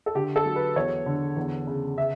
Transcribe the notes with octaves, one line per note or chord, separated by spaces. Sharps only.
A4
D3 G4
A4
F#3
B4
E2 C#5
D3
E2
C#3
C#3 E5